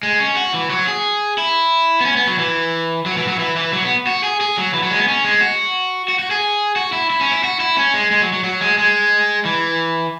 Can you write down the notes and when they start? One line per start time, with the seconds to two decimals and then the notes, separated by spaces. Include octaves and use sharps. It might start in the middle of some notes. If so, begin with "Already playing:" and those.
0.03 G#3
0.20 C#4
0.37 F#4
0.54 E3
0.70 F#3
0.87 G#4
1.38 E4
2.01 B3
2.05 C#4
2.16 B3
2.27 F#3
2.39 E3
3.06 F#3
3.17 E3
3.28 F#3
3.39 E3
3.56 E3
3.73 F#3
3.85 B3
4.07 F#4
4.23 G#4
4.41 G#4
4.57 F#3
4.74 E3
4.83 F#3
4.91 G#3
4.99 B3
5.08 C#4
5.25 G#3
5.41 F#4
6.08 F#4
6.19 F#4
6.31 G#4
6.76 F#4
6.93 E4
7.10 E4
7.21 C#4
7.32 E4
7.44 F#4
7.60 E4
7.77 C#4
7.94 G#3
8.11 G#3
8.22 F#3
8.33 F#3
8.44 F#3
8.61 G#3
8.78 G#3
9.45 E3